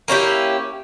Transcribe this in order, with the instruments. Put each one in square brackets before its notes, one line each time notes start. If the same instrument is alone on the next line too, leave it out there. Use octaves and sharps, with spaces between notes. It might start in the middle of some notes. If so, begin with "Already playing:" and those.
[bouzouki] A#3 C#4 E4 G4